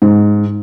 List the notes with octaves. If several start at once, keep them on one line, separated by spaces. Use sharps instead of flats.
G#2